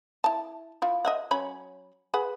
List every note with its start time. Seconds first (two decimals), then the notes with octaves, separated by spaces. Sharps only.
0.24 E4 A5
0.82 E4 F4
1.05 D#5 E5 F#5
1.31 F#3 C#4 B5
2.14 G#4 B4 F#5